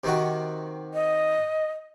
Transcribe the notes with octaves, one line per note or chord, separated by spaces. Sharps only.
C3 D#3 F#4
D#5